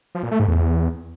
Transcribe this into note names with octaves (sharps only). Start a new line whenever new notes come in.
F3
A#2
A3
G#2
E2